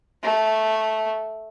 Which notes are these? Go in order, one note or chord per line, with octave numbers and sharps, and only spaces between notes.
A3